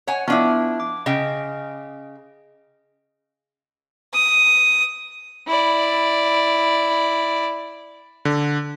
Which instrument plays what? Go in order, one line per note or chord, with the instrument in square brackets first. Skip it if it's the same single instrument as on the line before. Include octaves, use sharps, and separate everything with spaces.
[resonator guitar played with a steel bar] C#5 F#5 G#5
[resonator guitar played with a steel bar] F3 D4 E4 [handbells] B3
[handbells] D6
[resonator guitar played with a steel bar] C#3 G5 [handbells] D#5
[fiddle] D#6
E4 D5
[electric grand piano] D3